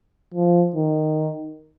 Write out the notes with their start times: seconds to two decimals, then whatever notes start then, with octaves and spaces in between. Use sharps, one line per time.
0.34 F3
0.76 D#3